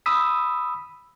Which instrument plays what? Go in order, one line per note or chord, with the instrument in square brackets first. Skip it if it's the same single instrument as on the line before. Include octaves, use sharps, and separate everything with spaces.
[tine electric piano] B5 D#6 E6 B6